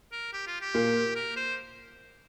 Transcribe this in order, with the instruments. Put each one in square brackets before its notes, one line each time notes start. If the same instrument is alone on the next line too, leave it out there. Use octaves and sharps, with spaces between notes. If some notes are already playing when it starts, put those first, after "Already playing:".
[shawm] A#4
G4
F4
G4
[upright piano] A#2 A#3
[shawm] A#4
C5